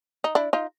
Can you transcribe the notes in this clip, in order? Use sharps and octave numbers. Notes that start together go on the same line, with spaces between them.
D#4
D4 E4
D#4 F4